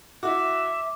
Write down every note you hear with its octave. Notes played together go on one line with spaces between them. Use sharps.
E4 F#4 E5 D6